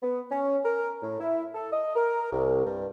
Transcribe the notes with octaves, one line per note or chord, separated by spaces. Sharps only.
B3
C#4
A#4
A2
E4
A4
D#5
A#4
C2
G2